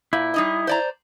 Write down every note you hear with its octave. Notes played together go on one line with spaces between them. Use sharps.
A#2 E4
G3 D#4 D#5
C5 D5 A#5